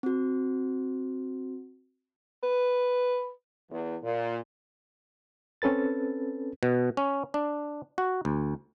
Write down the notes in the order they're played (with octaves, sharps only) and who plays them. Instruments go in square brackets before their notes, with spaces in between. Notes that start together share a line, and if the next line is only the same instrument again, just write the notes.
[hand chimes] C4 F#4
[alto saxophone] B4
[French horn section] E2
A#2
[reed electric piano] C4 C#4 A4 B4 A6
[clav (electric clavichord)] B2
C#4
D4
F#4
D2